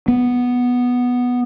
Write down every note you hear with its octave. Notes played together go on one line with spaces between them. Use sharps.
B3